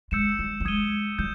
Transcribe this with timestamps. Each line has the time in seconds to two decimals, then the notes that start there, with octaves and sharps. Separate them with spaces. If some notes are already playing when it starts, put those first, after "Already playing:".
0.11 G#3 E6 G6 C#7 E7
0.39 G3
0.60 G3
0.65 G#3 D#6 G#6 D#7 G7
1.19 G3 G6